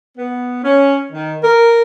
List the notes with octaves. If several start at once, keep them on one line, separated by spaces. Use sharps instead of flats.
B3
C#4
D#3
A#4